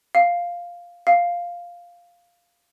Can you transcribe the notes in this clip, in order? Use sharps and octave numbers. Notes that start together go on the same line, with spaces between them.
F5
F5